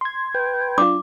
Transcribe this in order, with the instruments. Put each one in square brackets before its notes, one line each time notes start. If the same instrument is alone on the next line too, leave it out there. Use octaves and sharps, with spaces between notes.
[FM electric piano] C6 G#6
[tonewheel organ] B4 G5
[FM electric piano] D4 F4 [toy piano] D6